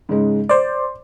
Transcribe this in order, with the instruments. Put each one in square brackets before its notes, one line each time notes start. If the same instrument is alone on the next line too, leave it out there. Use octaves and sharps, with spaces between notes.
[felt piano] G#2 C#3 G#3
[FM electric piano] C5 D5 [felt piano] C6